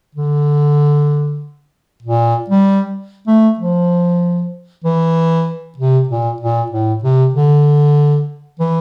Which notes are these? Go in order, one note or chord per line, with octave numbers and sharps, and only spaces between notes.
D3
A#2
G3
A3
F3
E3
C3
A#2
A#2
A2
C3
D3
E3